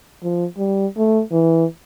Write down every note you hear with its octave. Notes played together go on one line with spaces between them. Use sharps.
F3
G3
A3
E3